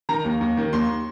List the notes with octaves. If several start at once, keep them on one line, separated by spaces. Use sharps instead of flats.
D#3 A#5
D#2
D#2
D#3
D#2 C6